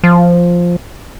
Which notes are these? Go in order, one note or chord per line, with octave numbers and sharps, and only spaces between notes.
F3